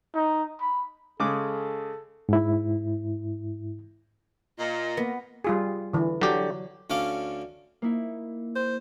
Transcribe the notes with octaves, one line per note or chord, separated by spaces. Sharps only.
D#4
B5
C#3 G#3 A4 D6
G#2 E4
A#2 D#5
A#3 B3
G3 F4 G#4
D3 E3
D3 F#3 G4
D2 D3 C#4 F5 D6
A#3 D#4 E4
C5